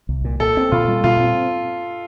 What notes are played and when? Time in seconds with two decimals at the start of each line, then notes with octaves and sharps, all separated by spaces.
0.09 C2
0.25 A#2
0.40 A#2 A4
0.57 C4
0.72 A#2 F4
0.88 G3
1.04 A#2 F4
1.19 C4